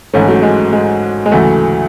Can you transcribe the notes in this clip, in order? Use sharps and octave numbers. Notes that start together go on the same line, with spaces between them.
G#1 G#2 E3 A3 C#4
F#3 A3
G#3
G#3
G#3
D2 C#3 E3 F#3 A3